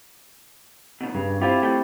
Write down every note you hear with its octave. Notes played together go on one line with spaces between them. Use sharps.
B2 D#3
G2 C#3
C4 E4 F4 G4
A3 A4 G5